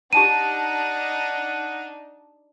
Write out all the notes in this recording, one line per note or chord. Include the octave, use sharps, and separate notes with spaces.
D4 D#4 G4 F#5 A5 A#5 D#7